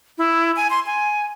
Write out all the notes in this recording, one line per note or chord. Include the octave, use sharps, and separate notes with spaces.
E4
G#5
C6
G#5